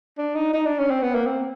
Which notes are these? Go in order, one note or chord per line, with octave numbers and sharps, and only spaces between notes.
D4
D#4
D#4
D4
C#4
C4
B3
A#3
C4